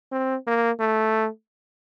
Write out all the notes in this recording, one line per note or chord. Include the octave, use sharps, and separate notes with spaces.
C4
A#3
A3